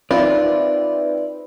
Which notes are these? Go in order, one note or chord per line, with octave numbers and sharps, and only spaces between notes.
C4 D#4 F4 B4 D5 E5